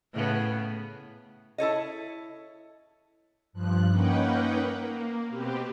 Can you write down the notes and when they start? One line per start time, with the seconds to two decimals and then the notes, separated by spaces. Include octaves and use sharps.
0.14 A2 C#3 B3
1.58 E4 A4 C#5 D#5
3.53 G2 F3 F#6
3.89 A#3 C#4 D#4 B4 F#5 G5
4.78 A#3
5.29 B2 B3 C4 G4